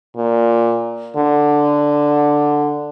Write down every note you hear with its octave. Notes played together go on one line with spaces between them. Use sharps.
A#2
D3